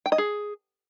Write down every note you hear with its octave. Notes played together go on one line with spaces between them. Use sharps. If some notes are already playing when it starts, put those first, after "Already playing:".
G5
D#5
G#4